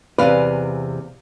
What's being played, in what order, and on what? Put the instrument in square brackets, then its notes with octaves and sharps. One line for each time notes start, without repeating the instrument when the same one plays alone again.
[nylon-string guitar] E2 C3 G#5 [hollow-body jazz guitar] B4 [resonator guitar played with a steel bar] D5 F5